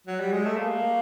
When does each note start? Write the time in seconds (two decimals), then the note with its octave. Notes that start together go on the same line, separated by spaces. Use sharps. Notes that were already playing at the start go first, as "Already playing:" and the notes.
0.07 F#3
0.20 G3
0.33 G#3
0.46 A3
0.57 A#3